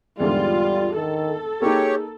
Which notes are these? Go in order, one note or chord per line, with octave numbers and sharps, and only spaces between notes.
E2 G#2 D3 G3 F4
D#3 A4
A#3 D#4 G4 G#4 C#5